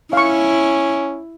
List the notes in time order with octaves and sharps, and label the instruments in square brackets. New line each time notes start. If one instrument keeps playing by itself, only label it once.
[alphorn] C#4 [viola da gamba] E4 [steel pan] F5 C#6